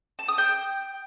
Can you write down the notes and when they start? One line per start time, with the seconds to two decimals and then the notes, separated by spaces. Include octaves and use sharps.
0.19 A5
0.28 D#6
0.38 G5